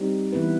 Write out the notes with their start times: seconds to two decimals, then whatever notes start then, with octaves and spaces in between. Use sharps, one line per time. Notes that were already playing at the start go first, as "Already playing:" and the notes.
Already playing: G3 C4 D#4 G4
0.33 E3 B3 E4 B4